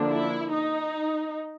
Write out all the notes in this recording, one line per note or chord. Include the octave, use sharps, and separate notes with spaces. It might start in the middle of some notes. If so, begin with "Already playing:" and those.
Already playing: D3 F3 A#3 D4
E4
D#4